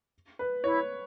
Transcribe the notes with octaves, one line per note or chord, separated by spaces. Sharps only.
B4
E4 C#5